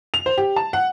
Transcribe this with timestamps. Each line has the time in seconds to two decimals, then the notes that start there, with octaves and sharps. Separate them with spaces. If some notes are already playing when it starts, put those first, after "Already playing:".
0.14 F7
0.26 C5
0.38 G4
0.56 A5
0.73 F#5